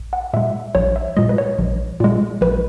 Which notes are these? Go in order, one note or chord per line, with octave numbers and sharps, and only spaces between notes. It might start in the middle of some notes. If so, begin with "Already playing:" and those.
Already playing: A#1
F#5
A#2 G#3 E5
A#1 C#5
E5
A#2 G#3 D#5
B4
C#5
A#1
A#2 G#3
A#1 B4